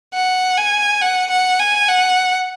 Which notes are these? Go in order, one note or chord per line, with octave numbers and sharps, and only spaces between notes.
F#5
G#5
F#5
F#5
G#5
F#5